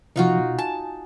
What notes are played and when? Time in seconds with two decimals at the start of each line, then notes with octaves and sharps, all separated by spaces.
0.16 C3 F3 D#4 F4 F#4
0.39 B2
0.58 G#5 A5